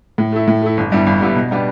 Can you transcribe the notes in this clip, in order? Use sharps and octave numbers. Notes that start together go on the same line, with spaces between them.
A2
A3 E4
A2
A3 E4
G1
G2 G3 B3 E4
G1
G2 G3 B3 E4
B2
G3 B3 D4 G4